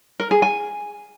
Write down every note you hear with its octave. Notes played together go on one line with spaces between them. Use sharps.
A#4
G#4
G#5